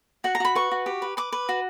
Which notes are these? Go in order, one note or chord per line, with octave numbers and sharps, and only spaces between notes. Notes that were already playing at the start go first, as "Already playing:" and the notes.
F#4 F#5
A#5
F#4 B5
B4 C#6
F#4
G4
B4
B4 D6
B4
F#4